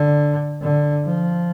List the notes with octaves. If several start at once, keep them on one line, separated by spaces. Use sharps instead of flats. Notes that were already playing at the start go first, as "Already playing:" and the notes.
Already playing: D3
D3
F3